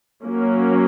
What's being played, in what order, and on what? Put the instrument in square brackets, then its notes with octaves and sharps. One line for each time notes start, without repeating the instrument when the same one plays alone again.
[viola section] F#3 A#3 C#4